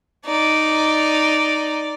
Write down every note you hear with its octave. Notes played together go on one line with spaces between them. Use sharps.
D#4 D5